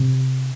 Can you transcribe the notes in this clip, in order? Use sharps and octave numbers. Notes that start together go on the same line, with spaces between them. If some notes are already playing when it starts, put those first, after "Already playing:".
Already playing: C3